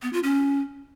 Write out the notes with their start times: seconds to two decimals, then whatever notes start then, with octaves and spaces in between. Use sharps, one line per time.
0.02 B3
0.13 F4
0.23 C#4